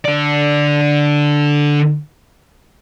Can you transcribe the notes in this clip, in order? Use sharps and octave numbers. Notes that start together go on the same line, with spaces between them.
D3 D5